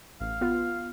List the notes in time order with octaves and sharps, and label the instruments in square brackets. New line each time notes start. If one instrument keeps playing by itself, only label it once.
[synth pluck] A1 [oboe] F5
[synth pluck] B3 F4